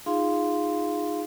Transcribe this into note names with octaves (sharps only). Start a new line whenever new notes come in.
D#4 F4 G#4 F5 C6